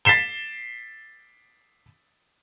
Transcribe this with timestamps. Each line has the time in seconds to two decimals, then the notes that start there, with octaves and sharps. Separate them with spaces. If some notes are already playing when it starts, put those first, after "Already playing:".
0.05 A6 B6 C7 E7 G7